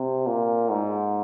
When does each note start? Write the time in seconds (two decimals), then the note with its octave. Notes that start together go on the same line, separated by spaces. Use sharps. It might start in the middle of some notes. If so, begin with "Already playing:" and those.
Already playing: C3
0.27 A#2
0.71 G#2